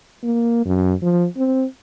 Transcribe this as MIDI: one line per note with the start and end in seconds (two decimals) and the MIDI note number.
0.23 0.62 58
0.66 0.93 42
1.03 1.25 53
1.37 1.64 60